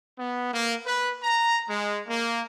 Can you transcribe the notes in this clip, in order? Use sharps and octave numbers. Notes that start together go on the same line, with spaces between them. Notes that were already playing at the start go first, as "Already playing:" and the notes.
B3
A#3
B4
A#5
G#3
A#3